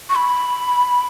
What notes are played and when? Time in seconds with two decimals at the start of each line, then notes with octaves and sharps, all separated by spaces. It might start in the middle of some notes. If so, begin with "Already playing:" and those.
0.09 C#6
0.16 B5